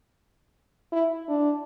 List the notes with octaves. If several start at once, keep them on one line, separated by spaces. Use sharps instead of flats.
E4
D4